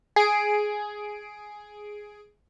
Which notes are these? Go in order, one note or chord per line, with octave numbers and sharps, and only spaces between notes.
G#4 D7